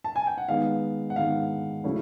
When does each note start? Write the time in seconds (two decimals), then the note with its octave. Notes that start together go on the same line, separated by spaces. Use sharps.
0.04 A5
0.16 G#5
0.27 G5
0.38 F#5
0.48 D#3 G#3 B3 F5
1.10 F#5
1.16 D#3 G#3 B3 F5
1.84 C#3 F#3 A3 C#4 E4